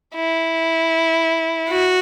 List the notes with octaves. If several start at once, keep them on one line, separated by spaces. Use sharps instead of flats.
E4
F#4